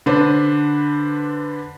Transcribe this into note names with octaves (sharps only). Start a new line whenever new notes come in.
D3 D4 B4 C5